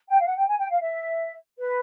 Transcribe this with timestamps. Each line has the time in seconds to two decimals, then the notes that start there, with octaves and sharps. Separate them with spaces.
0.09 G5
0.20 F5
0.26 F#5
0.37 G5
0.48 G#5
0.59 G5
0.70 F5
0.80 E5
1.58 B4